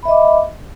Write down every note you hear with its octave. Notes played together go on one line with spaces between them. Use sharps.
D#5 E5 B5 D6